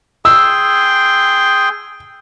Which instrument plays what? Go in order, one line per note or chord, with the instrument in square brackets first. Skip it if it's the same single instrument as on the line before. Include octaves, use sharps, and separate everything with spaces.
[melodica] G#4 G5 C6 [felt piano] E6